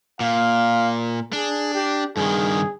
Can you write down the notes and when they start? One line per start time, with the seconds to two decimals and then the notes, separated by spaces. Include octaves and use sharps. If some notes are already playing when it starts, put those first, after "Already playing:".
0.20 A#2 F5
1.33 D4 G#4
1.74 G4
2.17 G2 D#3 G#4